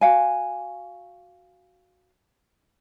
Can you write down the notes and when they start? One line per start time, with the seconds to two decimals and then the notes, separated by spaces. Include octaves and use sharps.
0.01 F#4 F5 G#5